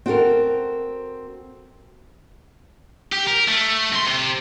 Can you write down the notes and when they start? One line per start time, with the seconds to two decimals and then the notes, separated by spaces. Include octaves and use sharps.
0.06 C4 F#4 A4 A#4
3.13 G4
3.27 A#4
3.48 A3
3.93 C3 C6
4.07 C3